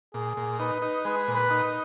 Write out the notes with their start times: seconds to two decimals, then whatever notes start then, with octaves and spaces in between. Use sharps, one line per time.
0.14 A#2 G#4
0.37 A#2
0.59 D#4 B4
0.82 D#4
1.05 G#3 B4
1.28 A#2
1.35 B4
1.50 D#4